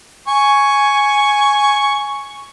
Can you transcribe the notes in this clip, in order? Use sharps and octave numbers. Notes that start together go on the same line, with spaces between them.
G#5 C#6